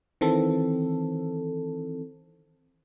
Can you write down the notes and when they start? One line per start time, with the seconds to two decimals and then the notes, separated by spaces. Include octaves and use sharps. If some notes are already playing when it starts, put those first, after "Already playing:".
0.21 D#3 E3 C4 A4